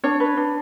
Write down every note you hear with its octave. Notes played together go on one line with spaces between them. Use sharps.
D4 C#5
B4
D4